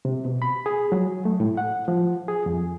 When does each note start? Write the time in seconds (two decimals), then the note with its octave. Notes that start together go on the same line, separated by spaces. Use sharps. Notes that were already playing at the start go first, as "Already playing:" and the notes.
0.05 C3
0.25 B2
0.42 B5
0.66 G#4
0.92 F#3
1.25 A3
1.40 A2
1.57 F#5
1.88 F3
2.28 G#4
2.46 F2